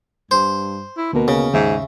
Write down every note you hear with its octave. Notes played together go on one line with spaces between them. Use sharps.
G2 C5
E4
D2 B2 A#3 A#4
C#3
D#2 G#2 E5